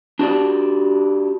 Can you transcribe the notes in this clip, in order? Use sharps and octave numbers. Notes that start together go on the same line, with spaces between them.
D4 F#4 G4 D5